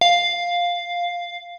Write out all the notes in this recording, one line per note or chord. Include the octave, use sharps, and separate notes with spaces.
F5